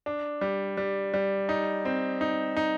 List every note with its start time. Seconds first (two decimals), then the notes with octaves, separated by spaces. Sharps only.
0.06 D4
0.41 G3
0.77 G3
1.14 G3
1.49 D#4
1.85 C4
2.21 D#4
2.57 D#4